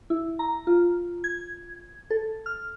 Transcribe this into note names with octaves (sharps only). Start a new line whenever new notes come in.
E4
A#5
F4
G#6
A4
F6